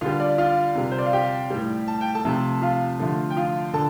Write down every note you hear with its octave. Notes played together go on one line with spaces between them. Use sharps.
D3 G3 F4 F5
D5
F4 F5
C3 G3
C5
D5
F5
G4 G5
A2 G3
A5
G5
A4 A5
C3 F3 A3
F4 F5
D3 F3 A3
G5
F4 F5
D3 A4 A5